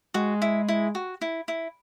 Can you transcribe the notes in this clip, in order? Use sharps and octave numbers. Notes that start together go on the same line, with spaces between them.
G#3 F#4
E4
E4
F#4
E4
E4